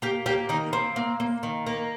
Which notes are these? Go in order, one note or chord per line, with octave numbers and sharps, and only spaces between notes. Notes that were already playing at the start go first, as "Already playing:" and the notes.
A#3 G4
A#3 G4
D#3 D#4
A#3 C4
A#3
A#3
D#3
A#3